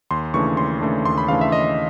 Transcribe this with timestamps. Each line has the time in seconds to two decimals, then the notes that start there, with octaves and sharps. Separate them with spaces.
0.11 D#2 C6
0.34 C#3 E3 A3 D4 C#6
0.57 D#2 C6
0.82 C#3 E3 A3 D4
1.05 D#2 C6
1.18 B5
1.28 C#3 E3 A3 D4 F5
1.41 E5
1.52 D#2 D#5